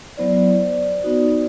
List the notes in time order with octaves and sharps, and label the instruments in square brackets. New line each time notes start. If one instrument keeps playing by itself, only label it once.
[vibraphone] F#3 B3 E4 C5 D5
B3 D#4 F#4